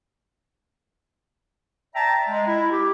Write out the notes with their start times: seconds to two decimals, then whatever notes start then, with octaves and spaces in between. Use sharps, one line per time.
1.95 D5 E5 G5 A5 A#5
2.28 G#3
2.46 E4
2.71 G4